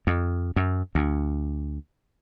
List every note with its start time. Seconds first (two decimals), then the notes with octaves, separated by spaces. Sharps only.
0.07 F2
0.56 F#2
0.95 D2